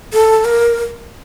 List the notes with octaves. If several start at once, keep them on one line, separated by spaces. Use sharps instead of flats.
A4
A#4